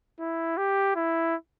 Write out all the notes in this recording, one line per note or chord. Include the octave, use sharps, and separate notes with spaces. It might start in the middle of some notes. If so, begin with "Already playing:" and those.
E4
G4
E4